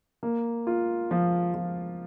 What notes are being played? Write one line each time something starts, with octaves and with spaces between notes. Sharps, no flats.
A#3
F4
F3
F3